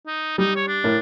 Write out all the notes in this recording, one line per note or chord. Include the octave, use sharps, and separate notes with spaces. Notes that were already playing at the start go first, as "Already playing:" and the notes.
D#4
G3 D#4
C#5
D4
A2 A#4